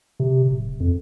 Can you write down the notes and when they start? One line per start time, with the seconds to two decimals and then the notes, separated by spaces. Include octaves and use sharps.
0.20 C3
0.50 D1
0.80 F2